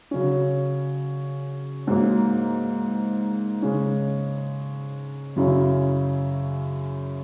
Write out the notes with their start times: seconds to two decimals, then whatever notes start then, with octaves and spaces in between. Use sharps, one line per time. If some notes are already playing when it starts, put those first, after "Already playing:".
0.11 C#3 F#3 C#4
1.87 G#2 F#3 A#3
3.62 C#3 G#3 C#4
5.36 F#2 C#3 F#3 C#4 E4